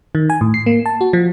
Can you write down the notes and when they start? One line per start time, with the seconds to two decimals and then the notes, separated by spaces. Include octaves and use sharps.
0.15 D#3
0.30 G#5
0.41 A2
0.54 C7
0.66 A#3
0.86 A5
1.01 F#4
1.13 F3